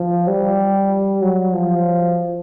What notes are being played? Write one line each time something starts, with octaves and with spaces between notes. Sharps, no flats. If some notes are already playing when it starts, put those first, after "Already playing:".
Already playing: F3
G3
F#3
F3